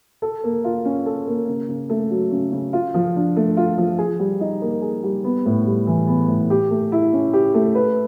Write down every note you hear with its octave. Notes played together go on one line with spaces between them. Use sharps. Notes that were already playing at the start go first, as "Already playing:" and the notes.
A4
A#3
F4
C#4
A4
A#3
C#3
C#3
A3
F#3
C#3
C#3
F4
F3
D4
A3
F4
F3
G#4
G3
D#4
A#3
G#4
G3
B3
A2
G3
E3
B3
A2
G4
A3
E4
C#4
G4
A3
B4